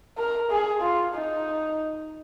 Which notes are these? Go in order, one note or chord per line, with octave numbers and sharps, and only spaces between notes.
A#4
G#4
F4
D#4